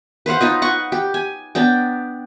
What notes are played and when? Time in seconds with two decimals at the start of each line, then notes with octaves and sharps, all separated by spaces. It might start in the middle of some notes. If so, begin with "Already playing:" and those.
0.26 B4 C5 F5 F#5
0.41 D#4 F4 B4 D#5
0.62 F#5 C#6
0.92 G4
1.14 G#5
1.55 B3 D4 G5